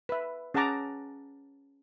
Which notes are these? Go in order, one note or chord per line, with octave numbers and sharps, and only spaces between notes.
B4 E5
C#4 G#4 F#5 A5 A#5 D6